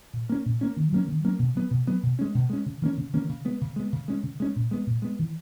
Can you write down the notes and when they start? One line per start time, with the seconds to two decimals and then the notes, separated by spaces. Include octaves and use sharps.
0.13 A#2
0.29 A#3 C#4
0.45 A#2
0.61 A#3 C#4
0.76 D#3
0.92 F#3 A#3 C#4
1.08 D#3
1.24 F#3 A#3 C#4
1.39 B2
1.55 F#3 B3
1.71 B2
1.87 F#3 B3
2.03 B2
2.19 G#3 C#4
2.35 B2
2.50 G#3 C#4
2.66 C#3
2.82 E3 A#3 C#4
2.97 C#3
3.13 E3 A#3 C#4
3.29 C#3
3.45 G#3 B3
3.61 C#3
3.76 G#3 B3
3.92 C#3
4.08 G#3 C#4
4.23 C#3
4.40 G#3 C#4
4.56 A#2
4.71 G#3 B3
4.87 A#2
5.02 G#3 B3
5.19 E3